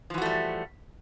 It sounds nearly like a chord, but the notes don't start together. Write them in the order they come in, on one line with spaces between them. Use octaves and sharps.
F3 E3 F#4 A3 G3